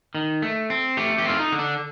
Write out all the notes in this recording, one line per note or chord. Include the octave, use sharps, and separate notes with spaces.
D#3
A3
C4
A3 G4
G4
C4 F4
D#4
D3
D4